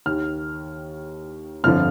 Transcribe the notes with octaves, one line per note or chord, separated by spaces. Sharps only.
D#2 D#3 F6
G1 F2 D3 F3 F6